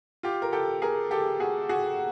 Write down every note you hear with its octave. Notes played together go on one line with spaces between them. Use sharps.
F4 G4
A#4
G4 A4
G#4 A#4
G4 A4
F#4 G#4
F#4 G#4